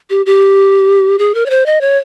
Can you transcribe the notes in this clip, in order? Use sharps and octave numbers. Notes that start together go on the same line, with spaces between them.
G4
G4
G#4
A#4
C#5
C5
D#5
C#5